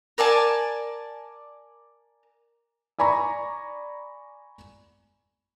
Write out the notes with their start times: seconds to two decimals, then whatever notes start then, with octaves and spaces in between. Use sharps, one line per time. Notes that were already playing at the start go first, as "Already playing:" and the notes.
0.18 A#4 D5 G#5 A5
2.99 D5 G#5 A#5 B5 C#6